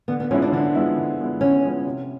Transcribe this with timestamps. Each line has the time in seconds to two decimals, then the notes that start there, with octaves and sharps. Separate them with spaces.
0.08 D3 B3
0.20 B3
0.31 F3 G#3 B3 C#4 E4
0.42 D4
0.52 D3 D4
0.75 F3 G#3 B3 E4
0.97 D3
1.19 F3 G#3 B3 E4
1.41 D3 C#4
1.63 F3 G#3 B3 E4
1.86 C3